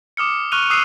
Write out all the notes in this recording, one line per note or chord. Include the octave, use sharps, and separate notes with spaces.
D6 D#6 F6 C#7
C#6 F6 F#6 D#7 F7
D#6 E6 F#6 C7 D#7